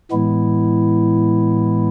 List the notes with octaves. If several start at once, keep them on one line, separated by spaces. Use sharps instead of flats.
A2 E3 G#3 B3 E4